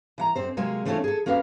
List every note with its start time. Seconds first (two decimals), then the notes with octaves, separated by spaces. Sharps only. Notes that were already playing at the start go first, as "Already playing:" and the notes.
0.18 E3 F#5 A#5
0.36 F#2 C4 C5
0.57 C3 F#3 G#3 A#3 G#4
0.85 E3 A3 C4 D4 F4 C#5
1.04 G#4 A4
1.26 A#3 C#4 F#4 B4 F5